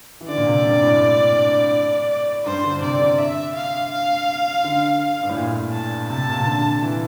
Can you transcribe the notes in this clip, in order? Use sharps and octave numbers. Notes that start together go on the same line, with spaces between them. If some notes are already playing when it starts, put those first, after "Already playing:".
E3
D3 D5
A#2
C3
G2
A2
G2 C5
D3
C3 D5
D3
E5
F5
F5
D3
G2
A2
A#2
A5
C3 A5
A#2
C3
D3
E3